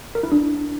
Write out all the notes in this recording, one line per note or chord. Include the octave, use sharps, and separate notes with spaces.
A#4
E4
D4